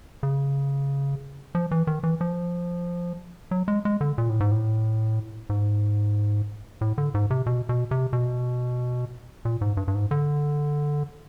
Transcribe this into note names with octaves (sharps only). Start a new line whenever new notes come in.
C#3
F3
E3
D#3
E3
F3
F#3
G#3
G#3
D3
A#2
A2
G#2
A2
G#2
A2
D3
G#2
C3
B2
B2
C3
B2
A#2
G#2
G2
G2
G#2
D3